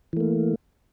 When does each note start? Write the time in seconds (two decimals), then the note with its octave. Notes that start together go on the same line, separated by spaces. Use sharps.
0.13 E3
0.17 A3
0.20 A#3